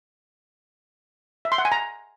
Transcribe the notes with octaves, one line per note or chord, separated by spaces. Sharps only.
E5
C6
F#5
G#5
A#5